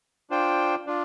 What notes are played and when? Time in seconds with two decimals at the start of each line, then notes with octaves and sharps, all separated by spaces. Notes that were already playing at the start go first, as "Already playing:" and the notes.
0.30 D4 F4 C5 G5
0.87 D4 F4